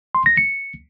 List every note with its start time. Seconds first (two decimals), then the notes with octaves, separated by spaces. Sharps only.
0.15 C6
0.26 A#6
0.37 C#7